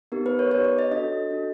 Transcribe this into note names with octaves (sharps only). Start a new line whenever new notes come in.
B3 D#4 G4 A#4
B4
C#5
B3 D#4 G4 C#5
D5
D#5
D4 F#4 A4 D#5
D4 F#4 A4